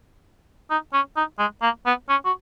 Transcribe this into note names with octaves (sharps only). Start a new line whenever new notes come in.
D#4
C#4
D#4
G#3
A#3
B3
C#4
F#4